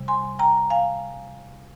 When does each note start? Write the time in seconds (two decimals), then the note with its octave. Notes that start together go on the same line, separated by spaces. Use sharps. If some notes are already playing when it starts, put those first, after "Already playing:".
Already playing: C3 G3
0.08 G#5 C6
0.39 G5 A#5
0.70 F5 G#5